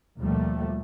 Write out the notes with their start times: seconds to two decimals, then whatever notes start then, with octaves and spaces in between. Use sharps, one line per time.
0.18 D#2 B2 F3 G3 A3